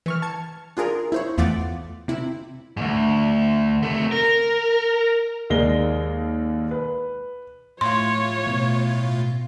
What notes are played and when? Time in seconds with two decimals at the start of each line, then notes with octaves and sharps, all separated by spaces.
0.06 E3 C#6 F6
0.22 A5 G#6 C#7
0.77 D4 F4 G#4 A#4
1.12 E4 C5 C#5
1.38 E2 A3 F4 F#5 D6 A6
2.08 C3 E4
2.77 D2 G#2
3.83 C3 A3
4.12 A#4
5.50 D#2 G#3 A#4 D5 A#6 G7
6.71 B4
7.81 A2 F4 C#5 C6
8.47 B2